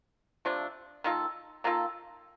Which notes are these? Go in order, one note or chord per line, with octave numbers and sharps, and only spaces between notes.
C3 F3 A3 D4
D#3 A#3 F4 A4
D#3 A#3 F4 A4